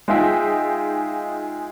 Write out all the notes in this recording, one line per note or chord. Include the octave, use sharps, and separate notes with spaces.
G#3 D#4 F4 G#4 E5 G5